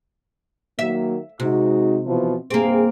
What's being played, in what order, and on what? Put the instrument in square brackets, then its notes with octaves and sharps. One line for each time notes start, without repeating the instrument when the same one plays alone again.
[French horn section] D#3 F#3 A#3 [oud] E5
[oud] C3 [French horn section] G#3 D#4 F#4
[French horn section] B2 E3 F3
[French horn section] G2 C3 G#4 [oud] A#3 C4